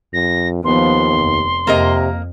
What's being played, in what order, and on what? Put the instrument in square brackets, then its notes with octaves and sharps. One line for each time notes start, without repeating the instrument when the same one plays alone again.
[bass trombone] F2 [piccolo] A#6
[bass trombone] D#2 [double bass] F3 B3 [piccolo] C6
[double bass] F1
[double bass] F2 [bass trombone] C3 [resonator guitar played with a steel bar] A#3 A#4 D#5